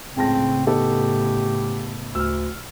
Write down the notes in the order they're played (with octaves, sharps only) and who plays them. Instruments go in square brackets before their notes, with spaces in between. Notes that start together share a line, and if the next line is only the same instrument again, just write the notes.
[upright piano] C#2 A5 A#6 [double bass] A2 C#3 [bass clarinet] C4
[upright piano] B3 D#4 A4 [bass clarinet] G4
[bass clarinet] D2 [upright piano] E6 F6